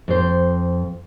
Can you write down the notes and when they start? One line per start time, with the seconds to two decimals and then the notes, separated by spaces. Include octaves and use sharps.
0.08 F2 C5